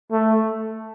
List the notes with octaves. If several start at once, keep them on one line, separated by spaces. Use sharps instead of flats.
A3